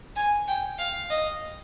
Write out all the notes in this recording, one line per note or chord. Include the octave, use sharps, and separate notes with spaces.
G#5
G5
F5
D#5